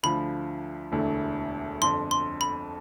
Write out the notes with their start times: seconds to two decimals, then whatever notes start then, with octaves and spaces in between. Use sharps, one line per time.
0.03 D2 D3 F3 B5
0.92 E1 D2 D3 A3 E4
1.81 G1 F2 D3 C6
2.11 C6
2.41 B5